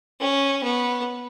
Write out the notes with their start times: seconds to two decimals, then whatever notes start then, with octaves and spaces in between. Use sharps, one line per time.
0.20 C#4
0.63 B3